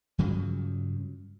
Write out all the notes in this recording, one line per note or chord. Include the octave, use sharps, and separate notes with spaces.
G2 C#3 F3 F#3